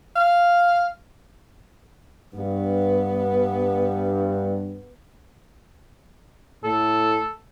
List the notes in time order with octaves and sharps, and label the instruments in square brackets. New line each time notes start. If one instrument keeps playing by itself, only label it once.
[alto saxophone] F5
[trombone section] G2 [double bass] B3
[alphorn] A2 [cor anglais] A4